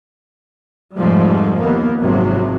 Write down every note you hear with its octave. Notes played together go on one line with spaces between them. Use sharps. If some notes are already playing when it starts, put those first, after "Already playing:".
F1 G#2 F3 G3 A3
D#2 A#3 B3
G#1 F#2 C3 F3 F#3